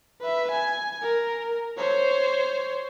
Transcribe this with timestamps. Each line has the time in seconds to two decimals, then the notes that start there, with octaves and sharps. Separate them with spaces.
0.21 B4 E5
0.51 G#5
1.02 A#4
1.78 C5 C#5